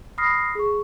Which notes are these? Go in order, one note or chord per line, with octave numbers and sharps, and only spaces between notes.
B5 D#6 F6 A#6 C7
G#4 C#6